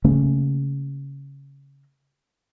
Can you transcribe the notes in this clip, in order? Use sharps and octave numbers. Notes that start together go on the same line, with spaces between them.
C#3 A3 A#3 C#4